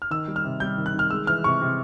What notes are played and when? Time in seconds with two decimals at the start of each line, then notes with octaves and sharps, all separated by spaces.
0.02 F6
0.11 D#3 E6
0.28 G3
0.36 F6
0.44 C3
0.60 G3 G6
0.77 D#3
0.86 F#6
0.94 D#3
0.99 F6
1.10 G#3 E6
1.27 E3 F6
1.44 C3 C#6
1.62 C3